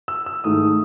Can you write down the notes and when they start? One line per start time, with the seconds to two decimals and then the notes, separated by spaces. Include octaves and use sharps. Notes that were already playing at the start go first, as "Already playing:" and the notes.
0.08 E6
0.26 E6
0.44 G#2 D#3 A3 D#6